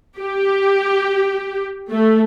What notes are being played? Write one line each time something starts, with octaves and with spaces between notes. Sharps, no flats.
G4
A3